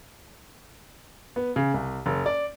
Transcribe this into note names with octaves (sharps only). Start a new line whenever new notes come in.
B3
C#3
C2
F#1
D5